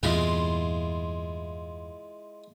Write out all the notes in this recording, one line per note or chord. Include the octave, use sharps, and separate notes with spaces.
E2 G2 A#2 G#3 E4 F4